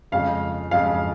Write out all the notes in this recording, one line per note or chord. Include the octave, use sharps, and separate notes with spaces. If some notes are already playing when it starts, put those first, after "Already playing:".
F2 C#3 G#3 F5
F2 C#3 G#3 F5